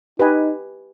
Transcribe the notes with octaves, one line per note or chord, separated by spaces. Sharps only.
D#4 G4 B4 D#5 G#5